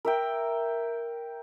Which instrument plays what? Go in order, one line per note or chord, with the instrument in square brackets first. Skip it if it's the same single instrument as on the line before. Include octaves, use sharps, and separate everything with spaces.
[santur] A#4 E5 G5